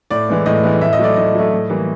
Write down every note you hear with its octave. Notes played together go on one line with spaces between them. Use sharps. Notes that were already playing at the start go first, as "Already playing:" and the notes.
A2 D5
E3 G#3 B3
A2 D#5
E3 G#3 B3
A2 E5
D#5
F#3 A3 D5
A2 D#5
F#3 A3
A2
E3 G3 A#3